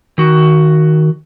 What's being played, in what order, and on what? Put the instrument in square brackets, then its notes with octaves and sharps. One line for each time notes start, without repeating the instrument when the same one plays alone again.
[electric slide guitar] D#3 F#4